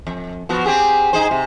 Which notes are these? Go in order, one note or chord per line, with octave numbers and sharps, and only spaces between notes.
F2
F3 B3 F#4
C4 G4 G#4
D#4 G#4 C5
C3